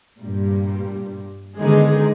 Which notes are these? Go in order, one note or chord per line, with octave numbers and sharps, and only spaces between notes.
G2 A#2 G3
D3 D#3 G#3 B3 D#4 G#4